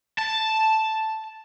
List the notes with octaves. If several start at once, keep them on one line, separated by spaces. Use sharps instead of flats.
A5